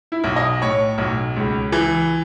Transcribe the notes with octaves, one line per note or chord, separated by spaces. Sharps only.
E4
B1
D#5
A2 C#5
B1
C#2
E3